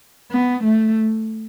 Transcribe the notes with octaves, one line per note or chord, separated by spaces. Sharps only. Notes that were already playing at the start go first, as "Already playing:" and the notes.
B3
A3